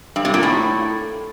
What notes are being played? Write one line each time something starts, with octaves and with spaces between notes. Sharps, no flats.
G2
C3
A#2
A2